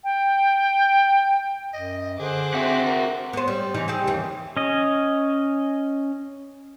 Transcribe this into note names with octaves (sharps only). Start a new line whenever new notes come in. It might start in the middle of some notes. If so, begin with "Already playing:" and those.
G5
F#2 D#5
D3 G#4 C5 D6 F#6
C4 F#4 E5 F#5
A#4
B3 C5
G3
C#3 E3 D#4
C4 G4 G#4
D#2 C#3 E3
C#4 D#5